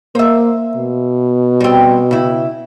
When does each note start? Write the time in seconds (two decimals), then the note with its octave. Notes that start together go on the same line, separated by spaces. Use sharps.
0.15 A#3 C5 E5
0.76 B2
1.61 G3 C4
2.11 C#3 E4